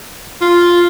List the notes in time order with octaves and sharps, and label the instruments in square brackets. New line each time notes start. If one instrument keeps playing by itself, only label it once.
[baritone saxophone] F4